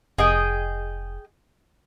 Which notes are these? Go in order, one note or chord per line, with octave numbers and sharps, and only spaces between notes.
F1 G#4 D#5 G5